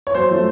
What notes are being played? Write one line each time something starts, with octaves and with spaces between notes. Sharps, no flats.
C#5
F#2 C5
F3 A3